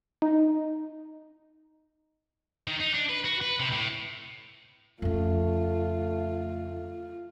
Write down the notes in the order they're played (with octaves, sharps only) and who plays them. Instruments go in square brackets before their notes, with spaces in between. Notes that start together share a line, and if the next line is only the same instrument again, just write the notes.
[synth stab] D#4
[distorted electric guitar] D#3
D#4
D4
B4
F#4
B4
C3
A2
[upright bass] F2 C#3 [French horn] A3 [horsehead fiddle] F4